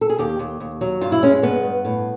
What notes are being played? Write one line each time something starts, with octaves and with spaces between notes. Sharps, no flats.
A4
G#4
D#2 G4
D#2
D#2
F#3
G2 F4
E4
G#3 C#4
G2 B3
G2
A2